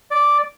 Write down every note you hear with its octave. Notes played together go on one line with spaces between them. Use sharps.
D5